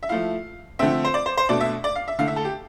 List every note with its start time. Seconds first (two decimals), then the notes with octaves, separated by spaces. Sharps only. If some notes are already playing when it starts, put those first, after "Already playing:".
0.03 E5
0.09 F3 A3 E4 F5
0.79 D3 F3 A3 C4 E5
1.04 C5
1.14 D5
1.26 C5
1.37 C5
1.49 B2 A3 D4 D5
1.61 E5
1.84 D5
1.96 F5
2.08 E5
2.19 D3 A3 E4 F5
2.28 E5
2.36 A4
2.45 G4